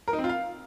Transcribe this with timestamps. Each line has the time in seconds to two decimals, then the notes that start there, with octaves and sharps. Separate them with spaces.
0.08 A#4
0.13 D#4
0.19 C4
0.24 F4
0.29 F5